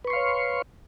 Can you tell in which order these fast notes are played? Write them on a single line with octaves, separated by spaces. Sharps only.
B4 C#6 C6 F5 C#5